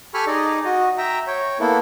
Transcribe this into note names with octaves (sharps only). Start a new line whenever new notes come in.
G4 A4 G#5 B5 C#6 F6
D#4 G#4 D5 D#5
F#4 D#5
E5 G5 A#5
C#5 G5
A#3 B3 E4 A4